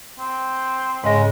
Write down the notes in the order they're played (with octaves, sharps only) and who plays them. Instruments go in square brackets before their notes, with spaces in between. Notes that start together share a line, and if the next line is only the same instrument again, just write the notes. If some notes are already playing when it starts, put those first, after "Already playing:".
[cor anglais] C4
[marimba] G#2 D#5 A#6 [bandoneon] C#3 G#3